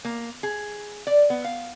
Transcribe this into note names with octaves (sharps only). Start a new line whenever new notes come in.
A#3
G#4
D5
B3
F5